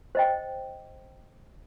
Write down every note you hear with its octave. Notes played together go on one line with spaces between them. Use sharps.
C5 D#5 G5